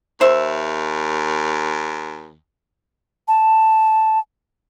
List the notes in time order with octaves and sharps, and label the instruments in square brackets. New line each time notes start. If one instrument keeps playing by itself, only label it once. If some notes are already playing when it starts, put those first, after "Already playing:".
[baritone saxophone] D#2 [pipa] C5 E5
[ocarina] A5